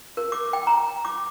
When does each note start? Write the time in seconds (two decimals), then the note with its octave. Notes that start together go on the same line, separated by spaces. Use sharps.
0.17 A#4
0.32 D6
0.53 G5
0.67 A#5
1.05 D6